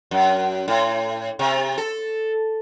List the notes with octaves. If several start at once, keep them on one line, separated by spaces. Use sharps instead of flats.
F#2
A2
C3
A4